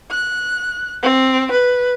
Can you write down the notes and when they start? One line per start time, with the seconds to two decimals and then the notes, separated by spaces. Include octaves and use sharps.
0.11 F#6
1.03 C4
1.52 B4